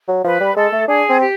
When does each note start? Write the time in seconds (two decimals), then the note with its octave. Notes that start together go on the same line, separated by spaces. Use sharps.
0.08 F#3
0.24 F3 B4
0.40 G3
0.56 G#3 A4
0.73 A3
0.88 D4 G#4
1.09 C4
1.19 G4